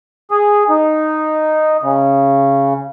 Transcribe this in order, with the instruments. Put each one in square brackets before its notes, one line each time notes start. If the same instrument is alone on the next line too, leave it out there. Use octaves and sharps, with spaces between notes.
[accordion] G#4
D#4
C#3